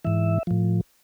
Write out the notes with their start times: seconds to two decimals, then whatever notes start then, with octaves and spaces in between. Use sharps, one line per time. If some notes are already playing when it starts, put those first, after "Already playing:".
0.04 G#2 E3 E5
0.47 A2 F3